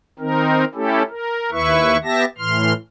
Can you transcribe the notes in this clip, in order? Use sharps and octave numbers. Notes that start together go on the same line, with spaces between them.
D#3 C4 D#4 A#4
A3 C#4 E4 G4 A4
A#4
D#2 E4 B4 E5 C#6
B3 G4 E5 A5 A#6
A2 E3 C6 F6